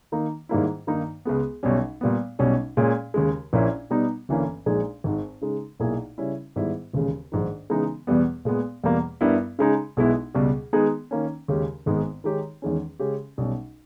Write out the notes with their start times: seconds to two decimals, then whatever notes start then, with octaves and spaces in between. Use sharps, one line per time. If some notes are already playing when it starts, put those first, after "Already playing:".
0.12 D#3 A#3 D#4
0.49 G#2 D#3 G3 A#3 E4
0.87 G2 D#3 A#3 D#4
1.25 C#2 C#3 G#3 B3
1.63 B1 B2 G3 C#4
2.01 A#2 G3 B3
2.39 B1 B2 G3 C#4
2.77 A#2 G#3 C#4 G#4
3.14 D#2 C#3 G#3
3.53 A#1 A#2 A#3 C#4 E4
3.90 B2 G3 B3 D#4
4.29 G1 G2 E3 A#3 C#4
4.66 A#1 A#2 G#3 D#4 G#4
5.04 G#1 G#2 D#3
5.41 C#3 G#3 D#4
5.79 B1 A#2 A#3 E4 G#4
6.18 C#3 G3 C#4 E4
6.56 G#2 D#3 G3 B3 E4
6.93 E1 D#2 C#3 G#3
7.32 A#1 G#2 D#3
7.70 C#3 E3 G#3 B3 D#4
8.07 E2 B2 G3 B3
8.45 A#2 G#3 B3
8.83 E2 B2 G3 A#3
9.21 G2 G3 B3 E4 A#4
9.59 C#3 G#3 D#4 G#4
9.97 B1 B2 G#3 B3 E4
10.34 C#2 B2 G3
10.73 D#3 G#3 B3 D#4 G#4
11.11 D#3 A#3 C#4
11.48 D#2 C#3 G#3 C#4 G4
11.86 G#1 G#2 D#3 G#3 B3
12.24 D#3 G#3 D#4 G4 C#5
12.62 E2 D#3 G#3 C#4
12.99 C#3 G#3 C#4 G4
13.38 B1 B2 G3 C#4